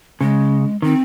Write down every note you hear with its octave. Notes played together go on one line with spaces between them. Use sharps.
C#3 G#3
D#3 C4